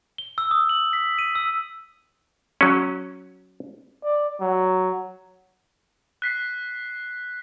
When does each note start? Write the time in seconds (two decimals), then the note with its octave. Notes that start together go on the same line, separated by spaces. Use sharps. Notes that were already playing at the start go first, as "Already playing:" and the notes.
0.18 G7
0.38 E6
0.51 D#6
0.69 F#7
0.93 B6
1.19 D#7
1.35 E6
2.61 F#3 C#4
4.03 D5
4.41 F#3
6.22 F#6 B6 C7